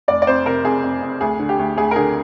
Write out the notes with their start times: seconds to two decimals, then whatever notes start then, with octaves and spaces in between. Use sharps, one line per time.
0.08 F1 D5
0.22 D5
0.27 F2 C5
0.45 C3 A#4
0.64 F2 G#4
0.83 F2
1.02 F2
1.21 D2 G#4
1.39 D3
1.49 G4
1.59 D2
1.77 D2 G#4
1.91 A#4
1.96 D3 G#4